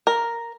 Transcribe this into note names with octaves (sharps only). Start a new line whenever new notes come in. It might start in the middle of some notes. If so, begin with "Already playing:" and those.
A#4